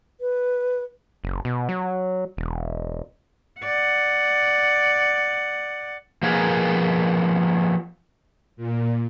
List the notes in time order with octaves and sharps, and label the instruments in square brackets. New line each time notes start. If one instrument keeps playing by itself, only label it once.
[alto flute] B4
[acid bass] F#1
B2
F#3
E1
[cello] D5 F#5
[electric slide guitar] F3 A#3 B3 G#4 A#4
[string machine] A#2